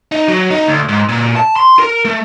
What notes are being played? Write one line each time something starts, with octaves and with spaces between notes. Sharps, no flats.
D#4
F#3
D#4
D2
G#2
A#2
A5
C6
A#4
A3